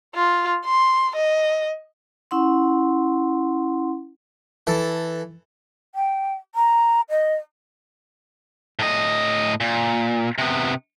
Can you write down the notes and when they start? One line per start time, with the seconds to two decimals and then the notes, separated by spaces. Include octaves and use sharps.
0.15 F4
0.65 C6
1.16 D#5
2.31 C#4 E4 F#5 C6
4.67 E3 A4
5.95 G5
6.55 A#5
7.10 D#5
8.79 A2 D#5
9.60 A#2
10.38 C3 B3